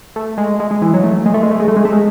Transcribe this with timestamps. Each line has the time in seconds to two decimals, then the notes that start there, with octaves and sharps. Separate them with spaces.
0.16 A3
0.38 G#3
0.60 G#3
0.71 G#3
0.82 E3
0.94 F#3
1.04 A3
1.26 G#3
1.34 A3
1.43 G#3
1.51 A3
1.59 G#3
1.68 A3
1.76 G#3
1.85 A3
1.93 G#3